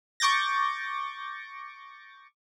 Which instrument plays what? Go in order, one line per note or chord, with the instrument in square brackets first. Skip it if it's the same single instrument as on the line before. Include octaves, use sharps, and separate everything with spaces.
[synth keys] C#6 D6 G6 A6 A#6